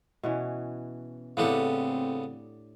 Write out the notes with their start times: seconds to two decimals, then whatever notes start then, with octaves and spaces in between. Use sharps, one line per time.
0.23 B2 E3 C#4
1.37 A2 C#3 B3 C4 D4 G4 A4